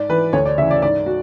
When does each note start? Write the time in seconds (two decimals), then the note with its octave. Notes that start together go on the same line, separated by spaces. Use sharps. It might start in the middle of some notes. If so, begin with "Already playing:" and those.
Already playing: G#2 D5
0.09 E3 B4
0.33 D2 C#5
0.46 D5
0.58 C#3 E3 E5
0.71 D5
0.82 G#2 D5
1.06 F#4